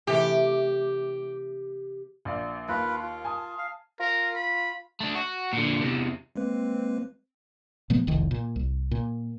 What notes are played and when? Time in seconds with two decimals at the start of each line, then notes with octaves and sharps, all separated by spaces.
0.07 C3 E3 A3 G4
2.25 A#1 D5 F5
2.69 D#2 F4 B4
3.02 F4
3.24 G#5 A5 D#6
3.58 F5
4.00 F4 A#4
4.36 B5
5.01 A3 D4
5.15 F#4
5.53 A#2 D3
5.82 E2 C3
6.36 G#3 A#3 C4 B4
7.90 A#2 F3 A3 B3
8.07 E1 C2 F2 D#3
8.31 A#2
8.56 C2
8.91 A#2